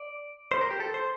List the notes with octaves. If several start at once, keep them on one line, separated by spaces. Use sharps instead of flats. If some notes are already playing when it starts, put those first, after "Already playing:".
Already playing: D5
C5
A#4
G4
A4
C5